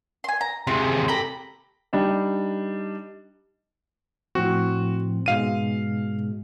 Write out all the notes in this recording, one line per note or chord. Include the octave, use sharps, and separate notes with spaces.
G#5 C6
A#5
C3 G#3 C4
G4 A4 A#5 B5
G3 D4 D#4
A2 F3 C4 F#4
G#2 B2 G#3 F5 D#7